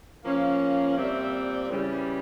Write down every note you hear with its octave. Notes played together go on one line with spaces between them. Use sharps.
F3 A#3 C#4 F5
A#2 G3 C4 E5
C#3 E3 G3